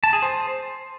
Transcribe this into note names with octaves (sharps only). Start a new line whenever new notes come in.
A5
G#4
C5